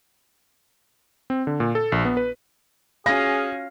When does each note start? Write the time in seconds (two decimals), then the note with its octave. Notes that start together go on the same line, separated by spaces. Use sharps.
1.30 C4
1.47 D3
1.60 A#2
1.75 A4
1.92 A#1
2.05 B3
2.17 B4
3.06 C#4 F#4 G#4 F5 A#6